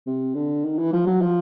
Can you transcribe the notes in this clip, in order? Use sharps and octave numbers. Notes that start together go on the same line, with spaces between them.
C3
D3
D#3
E3
F3
F#3
F3